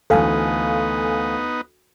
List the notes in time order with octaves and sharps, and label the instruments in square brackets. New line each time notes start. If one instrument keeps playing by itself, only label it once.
[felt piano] D2 E3 [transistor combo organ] B3 D#4 [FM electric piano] A4 F5 G#5